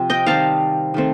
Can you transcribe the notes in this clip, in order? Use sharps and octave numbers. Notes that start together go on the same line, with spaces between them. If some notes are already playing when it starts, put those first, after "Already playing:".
Already playing: C3 F3 C4
D#5 G5
D#3 G3 C4 F5 A5
D#3 A3 C4